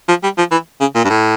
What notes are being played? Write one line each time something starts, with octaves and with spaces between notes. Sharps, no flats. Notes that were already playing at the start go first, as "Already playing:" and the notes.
F3
G3
F3
E3
C#3
A#2
G2
A2